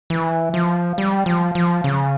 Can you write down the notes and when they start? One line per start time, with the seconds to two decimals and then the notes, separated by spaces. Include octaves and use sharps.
0.10 E3
0.54 F3
0.98 G3
1.26 F3
1.55 F3
1.84 C#3